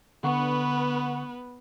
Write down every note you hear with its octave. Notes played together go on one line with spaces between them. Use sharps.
D3 B3 B4 F#5 C#6